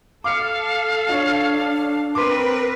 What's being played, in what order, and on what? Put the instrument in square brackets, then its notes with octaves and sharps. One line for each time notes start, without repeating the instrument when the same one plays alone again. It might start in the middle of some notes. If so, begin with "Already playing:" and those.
[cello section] A4 [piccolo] F5 [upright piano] D6 F6 C#7
[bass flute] D4 [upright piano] F4 C#5
[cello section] C4 A#4 B4 [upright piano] C6 D6